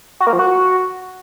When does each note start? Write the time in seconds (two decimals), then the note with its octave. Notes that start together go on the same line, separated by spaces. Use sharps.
0.20 F#4
0.27 A#3
0.33 F3
0.39 F#4